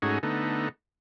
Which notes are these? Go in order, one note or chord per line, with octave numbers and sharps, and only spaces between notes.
G#2 A3 C#4 D#4 F#4 G#4
D3 A3 B3 D#4